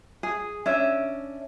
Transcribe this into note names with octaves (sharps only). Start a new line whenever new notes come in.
G#4
C#4 D4 E5